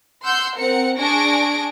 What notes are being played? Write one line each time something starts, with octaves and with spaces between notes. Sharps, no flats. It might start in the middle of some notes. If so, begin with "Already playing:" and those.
F#5 C6 E6 G6
C4 A#4 F#5 C#7
D4 G#4 G#5 C#6 A#6 D7